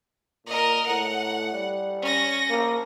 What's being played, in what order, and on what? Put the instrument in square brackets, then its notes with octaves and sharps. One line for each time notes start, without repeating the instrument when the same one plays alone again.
[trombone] A#2 [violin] A#4 D#5
[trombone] A2 [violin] F#5
[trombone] G3
[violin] C#4 A#6
[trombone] A#3